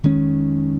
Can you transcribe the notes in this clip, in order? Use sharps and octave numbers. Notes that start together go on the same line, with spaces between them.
F2 D#3 G#3 C#4